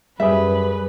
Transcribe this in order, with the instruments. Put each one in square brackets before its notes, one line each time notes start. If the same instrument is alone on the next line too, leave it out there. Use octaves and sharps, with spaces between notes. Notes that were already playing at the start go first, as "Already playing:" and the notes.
[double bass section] F#2 [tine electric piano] G3 G#4 [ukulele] G4 E5 [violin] B4